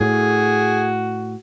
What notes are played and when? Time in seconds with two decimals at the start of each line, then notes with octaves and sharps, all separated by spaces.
0.01 A2 F#4 G#4